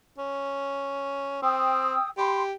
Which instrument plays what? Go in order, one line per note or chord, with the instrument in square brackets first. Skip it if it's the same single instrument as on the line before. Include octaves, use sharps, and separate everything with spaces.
[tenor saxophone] C#4
[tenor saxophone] C4 [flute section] G5 D#6 E6
[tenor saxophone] G4 [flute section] B5 C6